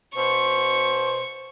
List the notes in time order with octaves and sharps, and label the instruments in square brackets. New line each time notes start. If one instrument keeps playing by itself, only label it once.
[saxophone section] B2 C5 [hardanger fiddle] C#6